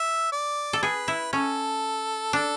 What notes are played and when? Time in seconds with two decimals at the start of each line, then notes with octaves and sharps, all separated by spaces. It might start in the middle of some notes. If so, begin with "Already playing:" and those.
Already playing: E5
0.32 D5
0.73 A4
0.83 G#4 B4
1.08 E4
1.33 C#4 A4
2.33 D4 A4